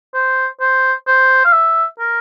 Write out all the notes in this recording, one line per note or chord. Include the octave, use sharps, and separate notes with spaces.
C5
C5
C5
F5
E5
A#4